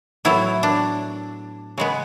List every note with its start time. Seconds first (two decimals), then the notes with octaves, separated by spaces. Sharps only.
0.25 A2 F#3 B3 E4
0.63 D4
1.78 C#3 G#3 B3